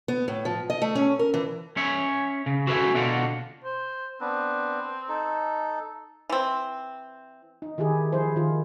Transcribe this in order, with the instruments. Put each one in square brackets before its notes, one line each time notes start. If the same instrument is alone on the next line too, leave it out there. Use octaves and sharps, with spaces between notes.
[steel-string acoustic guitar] B3
A2
F3
D#5
A3
C#4
A#4
E3
[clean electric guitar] C#4 C#5 E5
C#3
F#4 A4 B4 D5 E5 G#5
B2 D3 D4 F4 F#4
[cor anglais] C5
[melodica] B3 D4 B4 [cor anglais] C4
[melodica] D#4 A4
[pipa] E3 C4
[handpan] D#4
D#3 E4 G4 G#4
F3 E4 G#4 C5
D#3 F4